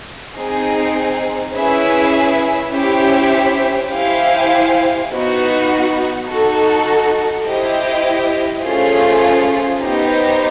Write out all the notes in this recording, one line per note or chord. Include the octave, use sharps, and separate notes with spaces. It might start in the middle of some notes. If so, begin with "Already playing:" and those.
C4 D#4 G#4
C#4 E4 G#4 B4 E5
C#4 E4 G4 C5 E5
E4 G4 C5 F5 G#5
B3 D#4 F#4
D#4 F#4 A4
E4 G4 C5 D#5
A3 C#4 F4 G#4 C5
B3 D#4 G4 C5